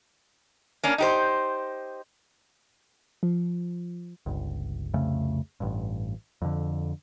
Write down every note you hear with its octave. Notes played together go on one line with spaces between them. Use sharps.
A#3 C#4 D4
D#4 G4 C5
F3
G1 C#2
C2 F2 C#3 A3
A1 G2
F2 D3